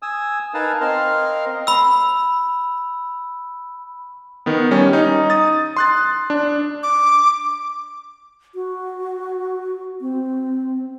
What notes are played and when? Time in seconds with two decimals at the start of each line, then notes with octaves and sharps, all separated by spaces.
0.02 G#5 D#6 E6
0.54 D#4 A#4 B4 F5 G#5 A5
0.80 C4 A#4 D#5 F5 C6 F6
1.67 B5 E6
4.46 D#3 B3
4.71 G3 C#4
4.93 D#4
5.30 D#6 A6
5.77 C6 F#6 A6
6.30 D4
6.83 D6
8.55 F#4
10.01 C4